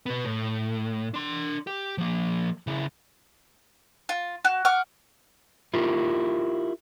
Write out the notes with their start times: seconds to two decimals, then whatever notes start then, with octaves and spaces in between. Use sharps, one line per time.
0.06 B2 B3
0.25 A2
1.14 D4 C6
1.67 G4
1.98 F3 A#3
2.67 C#3 E4
4.09 F4
4.45 F#4
4.65 F#5 C#6 D6 F6
5.74 E4 F4 G4 A#4